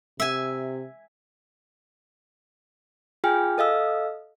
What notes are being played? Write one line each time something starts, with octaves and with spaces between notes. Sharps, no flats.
C3 E5 G#5
F4 G#4 G5 G#5 F6
A4 D#5 F5 E6